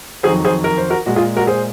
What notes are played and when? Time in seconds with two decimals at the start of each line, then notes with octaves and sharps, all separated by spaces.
0.23 F2 D#3 F#3 G#4 C5
0.45 G#4 C5
0.64 A#4
0.78 C5
0.90 F#4 A#4
1.06 A#2 G#3 F#4
1.16 F4 G#4
1.37 F#4 A#4
1.47 G#4 C5